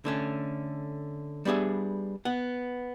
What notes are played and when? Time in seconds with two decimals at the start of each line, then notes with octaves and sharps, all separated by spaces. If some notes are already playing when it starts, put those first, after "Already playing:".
0.05 D3 A3 C#4
1.45 G3 B3 D4 G#4 E5
2.25 B3 F#5